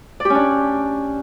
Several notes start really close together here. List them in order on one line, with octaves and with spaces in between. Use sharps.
D5 G4 C#4 D4